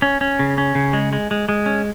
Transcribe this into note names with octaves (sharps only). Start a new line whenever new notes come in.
C#4
C#4
C#3
C#4
C#3
G#3
G#3
G#3
G#3
C#4